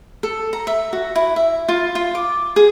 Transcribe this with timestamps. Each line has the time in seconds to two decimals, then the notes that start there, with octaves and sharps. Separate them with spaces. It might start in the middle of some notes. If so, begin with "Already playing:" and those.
0.23 A4
0.53 A#5
0.67 E5
0.93 F#4
1.15 E4
1.36 E5
1.69 F4
1.95 F4
2.15 D6
2.56 G#4